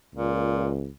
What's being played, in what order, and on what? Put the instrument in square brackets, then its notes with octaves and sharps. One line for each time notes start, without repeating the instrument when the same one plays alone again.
[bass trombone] C#2 [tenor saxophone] A#2